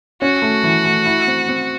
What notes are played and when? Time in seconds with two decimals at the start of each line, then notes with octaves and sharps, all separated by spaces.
0.21 C#4 F#4
0.42 A3
0.64 E3
0.85 A3
1.06 E4
1.27 C4
1.49 C4